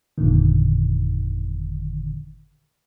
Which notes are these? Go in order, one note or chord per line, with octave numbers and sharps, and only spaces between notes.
G1 F2 A#2 D3 D#3